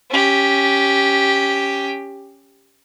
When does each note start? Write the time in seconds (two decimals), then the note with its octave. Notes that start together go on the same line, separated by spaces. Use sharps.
0.10 C#4 G4